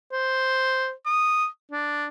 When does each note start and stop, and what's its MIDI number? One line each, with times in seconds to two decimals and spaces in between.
0.12 0.91 72
1.06 1.46 87
1.71 2.07 62